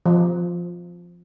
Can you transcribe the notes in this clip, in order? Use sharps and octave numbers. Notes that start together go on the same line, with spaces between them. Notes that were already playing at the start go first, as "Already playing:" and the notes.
F3